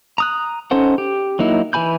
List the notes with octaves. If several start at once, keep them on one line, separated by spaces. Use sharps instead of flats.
A#5 D#6 F#6
C#4 D#4 A4 C5 F#5
G4
F#3 A#3 D#4 E4
E3 A#4 G#5 B5 G6